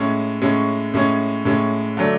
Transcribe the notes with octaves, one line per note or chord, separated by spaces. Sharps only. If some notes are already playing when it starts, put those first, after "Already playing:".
Already playing: A2 G#3 C#4
A2 G#3 C#4
A2 G#3 C#4
A2 G#3 C#4
D3 F#3 A3 D4